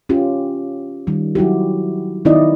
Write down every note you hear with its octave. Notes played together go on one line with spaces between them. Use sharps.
C#4 F4 G4
D#3 G3
F#3 E4 F#4 G4
D#3 B3 D#4 E4 D5 D#5